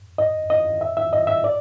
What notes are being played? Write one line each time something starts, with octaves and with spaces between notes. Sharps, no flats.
D#5
D#5
E5
E5
D#5
E5
D5